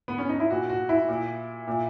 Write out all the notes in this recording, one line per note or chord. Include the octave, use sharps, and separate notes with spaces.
B3
C#4
D#4
E4
A#2 F#4
F#4
E4
A#2
A#2